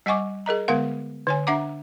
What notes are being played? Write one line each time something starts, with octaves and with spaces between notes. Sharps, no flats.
G3 D#5 F#5 G#5 C#6 D6
G#4 A#4 D#5 A#5
D3 G#3 B3 A#4 F5 F#5
D3 C#5 G#5
D4 E5 F#5 A#5 D6